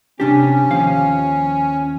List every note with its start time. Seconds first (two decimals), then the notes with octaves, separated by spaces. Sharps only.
0.20 C3 C#4 D4 G4
0.71 D#2 F3 F5